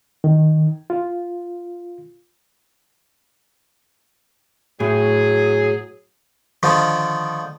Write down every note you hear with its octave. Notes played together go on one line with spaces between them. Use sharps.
D#3
F4
A2 F#3 G#4
D3 D#3 F3